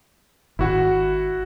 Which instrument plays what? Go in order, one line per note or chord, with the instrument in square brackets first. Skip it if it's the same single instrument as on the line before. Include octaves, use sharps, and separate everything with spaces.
[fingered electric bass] G#1 [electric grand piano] E4 F#4 F#5